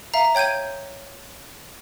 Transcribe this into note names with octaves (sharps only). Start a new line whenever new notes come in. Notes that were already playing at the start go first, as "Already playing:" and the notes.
E5 F5 A#5
C#5 G5 G6 G#6 D#7